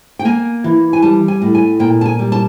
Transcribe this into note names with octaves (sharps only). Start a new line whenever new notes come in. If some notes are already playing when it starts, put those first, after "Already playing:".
G5
A#3 G#5
E3
G#5
G3 A5
G#5
A2
G#5
A#2 G5
A5
G#5
G3
A5